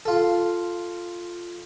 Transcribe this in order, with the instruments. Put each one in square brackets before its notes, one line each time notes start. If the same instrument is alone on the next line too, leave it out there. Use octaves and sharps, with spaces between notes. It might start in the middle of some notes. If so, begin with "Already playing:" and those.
[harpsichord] F4 A4